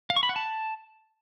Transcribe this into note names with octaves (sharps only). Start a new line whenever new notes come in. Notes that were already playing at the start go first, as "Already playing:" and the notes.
F5
C#6
B5
F#5
A5